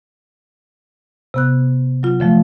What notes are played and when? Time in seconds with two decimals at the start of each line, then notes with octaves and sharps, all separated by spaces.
1.34 C3 B3 F#6
2.03 F#3 F4
2.20 D3 F3 A3